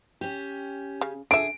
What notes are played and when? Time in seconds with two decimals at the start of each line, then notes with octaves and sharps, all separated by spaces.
0.21 C#4 G4
1.01 C#3
1.31 D3 G#4 E5 D7